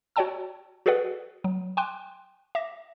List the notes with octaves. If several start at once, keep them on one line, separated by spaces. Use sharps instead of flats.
F#4 C#5 D5 G5 A5 E6
F#4 G#4 A4 B4 D5 F#5
F#3
G5 G#5 C6 D6 F#6 D#7
E5 D6 A#6